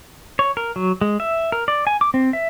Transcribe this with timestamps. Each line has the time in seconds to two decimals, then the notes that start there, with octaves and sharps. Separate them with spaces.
0.39 C#5
0.57 A#4
0.76 F#3
1.01 G#3
1.20 E5
1.52 A#4
1.68 D5
1.87 G#5
2.01 D6
2.14 C4
2.33 E5